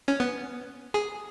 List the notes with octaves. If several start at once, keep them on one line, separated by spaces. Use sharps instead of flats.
C#4
B3
G#4